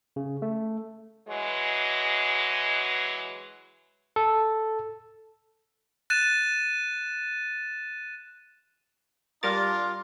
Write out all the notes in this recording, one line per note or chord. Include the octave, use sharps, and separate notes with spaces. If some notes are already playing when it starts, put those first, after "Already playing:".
C#3
A3
E3 F#3 G#3
A4
F#6 A6 D#7 E7
G3 D4 F4 A#4 A6